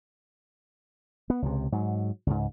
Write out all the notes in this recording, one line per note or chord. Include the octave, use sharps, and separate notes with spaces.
B3
C#2 C3
G#2 F#3
C#2 G#2